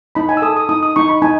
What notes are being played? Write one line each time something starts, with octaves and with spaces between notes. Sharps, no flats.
D#4 B5
G#5
E6
A4 D#6
D#6
D#4 D#6
D#6
D#4 C#6
B5
D#4 G#5